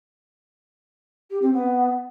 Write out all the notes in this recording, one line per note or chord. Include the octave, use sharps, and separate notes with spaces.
G4
C4
B3